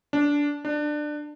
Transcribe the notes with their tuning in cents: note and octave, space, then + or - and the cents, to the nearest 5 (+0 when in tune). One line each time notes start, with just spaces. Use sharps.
D4 -15
D4 +20